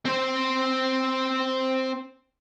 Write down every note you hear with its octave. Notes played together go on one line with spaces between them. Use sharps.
C4 C5